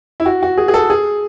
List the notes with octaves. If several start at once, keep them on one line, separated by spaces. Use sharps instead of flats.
E4
F#4
F#4
G#4
G#4
A4
G#4